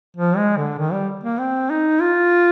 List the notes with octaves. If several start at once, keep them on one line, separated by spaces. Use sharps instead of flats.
F3
G#3
D3
D#3
G3
A#3
C4
D#4
F4